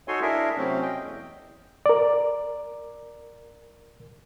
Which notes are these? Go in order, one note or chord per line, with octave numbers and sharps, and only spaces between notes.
D#4 F#4 A4 C#5 G#5 C6
D4 E4 G#4 A#4 E5
C3 F#3 A3 C4 C#4
D#5 G5
E2
A#4 D5